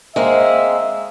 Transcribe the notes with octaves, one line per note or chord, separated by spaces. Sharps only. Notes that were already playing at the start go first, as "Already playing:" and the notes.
G#3 A#3 C4 E5